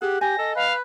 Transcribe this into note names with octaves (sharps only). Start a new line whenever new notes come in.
G4 G#4 F#5
G4 G5 G#5 A#6
A4 D#5
B4 F5